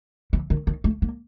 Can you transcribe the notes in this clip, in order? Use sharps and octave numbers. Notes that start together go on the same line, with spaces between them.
E3
D#3
D#3
A3
A#3